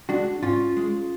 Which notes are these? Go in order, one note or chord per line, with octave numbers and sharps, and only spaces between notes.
G#3 D4 F#4
G#2 C#4 F4
G#3